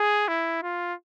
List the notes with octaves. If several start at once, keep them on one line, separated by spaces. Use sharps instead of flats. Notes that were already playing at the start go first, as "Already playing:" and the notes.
Already playing: G#4
E4
F4